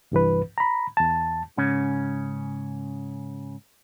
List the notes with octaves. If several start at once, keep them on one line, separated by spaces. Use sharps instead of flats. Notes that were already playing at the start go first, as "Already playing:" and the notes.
C2 G2 E3 B4
A#5 B5
E2 A5
G#2 C#3 C#4